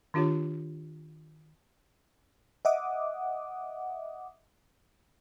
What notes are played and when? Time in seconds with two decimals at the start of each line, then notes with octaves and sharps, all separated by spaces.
0.14 D#3 D4 F4 G4 C#5
2.65 D#5 E5 F#5 D6 D#6